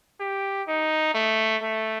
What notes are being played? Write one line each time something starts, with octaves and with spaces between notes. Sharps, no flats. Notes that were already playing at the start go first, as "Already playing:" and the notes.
G4
D#4
A3
A3